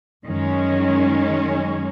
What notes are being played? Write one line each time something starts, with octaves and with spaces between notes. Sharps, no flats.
F#2 D#3 G#3 C#4